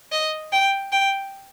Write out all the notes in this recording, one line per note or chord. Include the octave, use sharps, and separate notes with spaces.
D#5
G5
G5